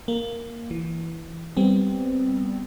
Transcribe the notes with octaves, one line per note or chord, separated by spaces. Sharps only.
A#3
E3
G3 B3 C4